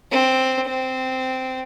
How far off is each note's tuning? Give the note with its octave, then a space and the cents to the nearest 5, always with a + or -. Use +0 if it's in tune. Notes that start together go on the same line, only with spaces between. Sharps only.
C4 +0
C4 -10